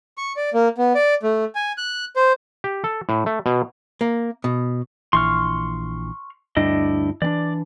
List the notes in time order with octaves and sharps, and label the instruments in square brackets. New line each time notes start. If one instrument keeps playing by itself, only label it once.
[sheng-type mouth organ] C#6
D5
A#3
B3
D5
A3
G#5
F#6
C5
[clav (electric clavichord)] G4
A4
A2
A3
B2
[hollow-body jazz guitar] A#3
B2
[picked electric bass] A#1 E3 [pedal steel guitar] C6 C#6 F6
[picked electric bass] D2 G2 G3 [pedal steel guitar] D4 E4 D#5
[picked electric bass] E3 C4 D4 [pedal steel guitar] D5